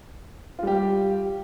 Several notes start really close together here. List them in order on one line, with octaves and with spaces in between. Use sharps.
F4 G3 G4